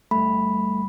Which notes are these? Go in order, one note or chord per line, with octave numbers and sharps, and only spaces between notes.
G1 G3 A3 B5